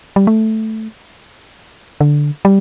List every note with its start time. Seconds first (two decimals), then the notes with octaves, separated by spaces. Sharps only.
0.16 G3
0.27 A3
2.01 D3
2.45 G3